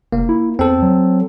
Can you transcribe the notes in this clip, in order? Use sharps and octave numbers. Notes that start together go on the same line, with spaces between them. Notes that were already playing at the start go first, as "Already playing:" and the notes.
F1 A#3
E4
E2 C4 A4
F#3